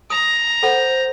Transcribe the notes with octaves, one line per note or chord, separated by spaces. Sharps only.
A#5 D#6
A4 C5 F#5 B5